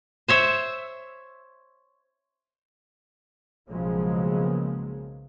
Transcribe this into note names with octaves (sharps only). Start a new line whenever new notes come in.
C5 C#5 E5
B1 C#3 F3 F#3 G#3 A#3